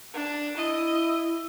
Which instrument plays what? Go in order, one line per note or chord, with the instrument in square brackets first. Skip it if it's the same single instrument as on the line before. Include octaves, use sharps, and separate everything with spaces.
[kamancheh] D4
[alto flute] E4 [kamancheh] D#5